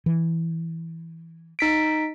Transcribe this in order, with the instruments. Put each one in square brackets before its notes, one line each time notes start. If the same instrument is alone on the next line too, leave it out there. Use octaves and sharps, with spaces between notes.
[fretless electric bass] E3
[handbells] D#4 B6 D7